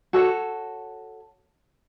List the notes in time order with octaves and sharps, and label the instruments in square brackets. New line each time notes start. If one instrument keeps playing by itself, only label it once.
[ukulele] F#4 A4 C#5